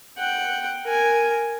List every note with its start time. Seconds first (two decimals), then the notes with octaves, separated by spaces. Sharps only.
0.18 F#5 G5
0.84 A#4 G#5